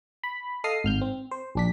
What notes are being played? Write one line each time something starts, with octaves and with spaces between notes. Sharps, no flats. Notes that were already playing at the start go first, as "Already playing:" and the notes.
B5
A4 D#5 F5 D#6 C7
G#1 F6 G6
C4
C5
A#1 D4 B6